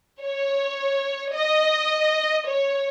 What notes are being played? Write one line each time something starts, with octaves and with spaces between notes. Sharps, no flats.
C#5
D#5
C#5